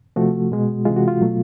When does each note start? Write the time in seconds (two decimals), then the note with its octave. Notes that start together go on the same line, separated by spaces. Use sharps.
0.16 C3 F3 A3 F#4
0.52 B2 G#3
0.85 C3 E3 G#3 F4
0.97 F#4
1.08 F4
1.21 B2 F#3 A3